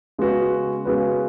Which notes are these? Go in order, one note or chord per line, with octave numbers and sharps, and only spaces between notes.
C#3 G#3 B3 F#4 B4
C#3 G#3 B3 F#4 B4